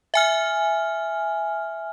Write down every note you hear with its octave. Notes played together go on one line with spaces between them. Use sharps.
E5 G#5 F6